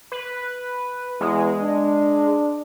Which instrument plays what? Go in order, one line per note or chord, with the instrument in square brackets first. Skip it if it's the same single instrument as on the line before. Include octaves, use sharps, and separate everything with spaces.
[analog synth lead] B4
[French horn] E2 [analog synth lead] G#3
[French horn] D4